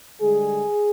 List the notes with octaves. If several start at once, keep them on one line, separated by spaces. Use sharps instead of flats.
D3 G3 G#3 G#4